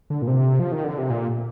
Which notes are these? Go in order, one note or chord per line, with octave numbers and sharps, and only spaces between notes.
D3
A#2
C3
F3
D#3
D3
C3
A#2